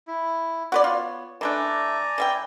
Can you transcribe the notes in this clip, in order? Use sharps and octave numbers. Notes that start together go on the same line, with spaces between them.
E4
B3 F#4 B4 C#5 D5
F4
E3 A3 D4 D5 G#5 A#5
E3 E5 G5